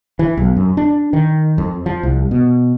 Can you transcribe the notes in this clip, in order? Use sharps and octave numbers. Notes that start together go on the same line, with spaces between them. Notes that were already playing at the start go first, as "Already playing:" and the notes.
E3
B1
F#2
D4
D#3
F2
F3
C2
B2